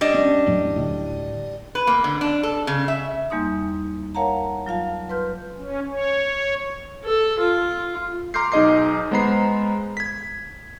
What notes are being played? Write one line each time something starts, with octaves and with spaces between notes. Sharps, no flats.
G3 D4 D#5
C#4
E2 A2 F#3
D2 A2
B4
A#3
D3
D4
A4
C#3
E5
E2 G3 A#3 D#4 C6 D#6
A#4 C#5 F5 F#5 A5 A#5
F#3 F4 F5 A5
B4 C6 F6 G6
C#4
C#5
A4
F4
A#5 C6 D6 F6 G6 C7
B1 D#4 G#4 D#5 D6 C7
G#3 B3 C5 A#5 B5 C7
G#6 B6